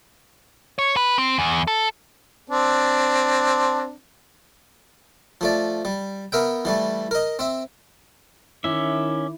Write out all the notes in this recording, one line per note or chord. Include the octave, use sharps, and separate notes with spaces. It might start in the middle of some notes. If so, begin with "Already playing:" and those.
C#5
B4
C4
E2
A4
C4 D4
F3 A3 D5
G3
B3 A#4 E5 G5
E3 G3 A3
A#4 D#5
C4 E5
D#3 C#4 E4 E5 D6